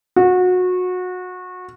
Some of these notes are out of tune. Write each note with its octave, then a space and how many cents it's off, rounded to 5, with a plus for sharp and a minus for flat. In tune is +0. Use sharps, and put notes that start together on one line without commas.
F#4 -25